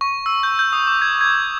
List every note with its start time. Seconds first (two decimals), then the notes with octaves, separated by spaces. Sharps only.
0.01 C#6
0.26 E6
0.43 G6
0.59 G6
0.73 D#6
0.87 D6
1.02 G#6
1.21 G#6